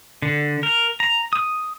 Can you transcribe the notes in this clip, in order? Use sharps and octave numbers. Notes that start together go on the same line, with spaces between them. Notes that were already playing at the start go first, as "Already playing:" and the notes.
D3
A#4
A#5
D#6